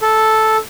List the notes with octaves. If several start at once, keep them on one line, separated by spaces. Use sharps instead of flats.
A4